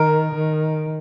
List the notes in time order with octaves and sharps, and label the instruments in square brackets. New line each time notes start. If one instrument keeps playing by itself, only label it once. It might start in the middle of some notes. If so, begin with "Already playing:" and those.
Already playing: [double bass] D#3 [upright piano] A#4
[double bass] D#3